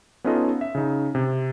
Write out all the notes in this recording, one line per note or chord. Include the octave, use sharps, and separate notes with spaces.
B3 C#4 D#4 F4 A4 D#5
E5
C#3 D#4
C3